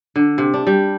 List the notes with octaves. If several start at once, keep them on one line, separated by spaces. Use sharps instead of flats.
D3
C3
D4
G3